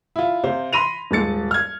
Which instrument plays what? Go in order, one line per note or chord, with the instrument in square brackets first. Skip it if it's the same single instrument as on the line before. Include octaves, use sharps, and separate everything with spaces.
[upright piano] E4 F4
C3 C5 F5
B5 C6 A#6 D#7 F7
D#1 G#2 G#3 A6 C#7
F6 G#6